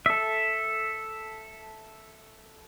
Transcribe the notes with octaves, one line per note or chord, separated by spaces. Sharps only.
A4 E5